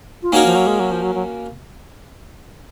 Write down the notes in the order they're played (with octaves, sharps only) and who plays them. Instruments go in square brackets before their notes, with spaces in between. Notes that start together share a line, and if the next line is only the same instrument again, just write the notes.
[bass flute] F4
[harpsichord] A#3 C#4 F#4 A#4 C#5 [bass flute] D#4
[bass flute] F3
F#3
G#3
F#3
F3
F#3
F#3